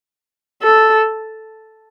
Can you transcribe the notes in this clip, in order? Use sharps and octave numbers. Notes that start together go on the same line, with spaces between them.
A4